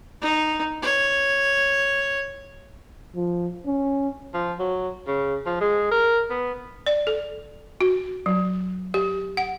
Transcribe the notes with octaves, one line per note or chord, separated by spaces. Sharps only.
D#4
C#5
F3
C#4
F3
F#3
C#3
F3
G#3
A#4
B3
D5
A4
F#4
F#3
G4
F#5